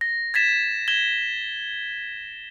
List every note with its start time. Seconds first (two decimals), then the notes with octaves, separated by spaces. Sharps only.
0.01 A#6
0.34 G#6 A6 B6 E7
0.88 G#6 E7 G7